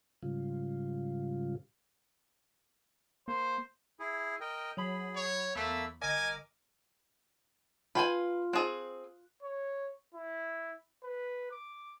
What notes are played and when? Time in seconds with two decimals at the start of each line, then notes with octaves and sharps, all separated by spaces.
0.23 G#2 C#3 G3 F4
3.28 A#3 C5
4.00 E4 G#4
4.40 A#4 D#5 G5
4.77 F#3 G#4 B5
5.16 C#5
5.55 E2 A3 A#3 B5 E6
6.02 G1 A#4 D#5 G#5 D6
7.95 F4 B4 G5 G#5
8.53 C4 G#4 F#6
9.42 C#5
10.14 E4
11.03 B4
11.51 D6